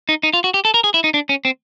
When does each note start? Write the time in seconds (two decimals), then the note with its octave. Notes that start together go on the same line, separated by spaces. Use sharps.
0.09 D#4
0.23 D#4
0.33 F4
0.44 F#4
0.54 G4
0.65 A4
0.74 A#4
0.84 G#4
0.94 E4
1.04 D#4
1.14 D4
1.29 C#4
1.45 C4